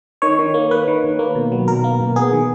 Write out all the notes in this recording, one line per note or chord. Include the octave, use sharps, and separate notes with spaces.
D#3 C#5
D#3
A#3
A#3 B4
D#3
D#3
A#3
B2
F#3
B2 A#4
A#3
B2
B3 G#4
D#3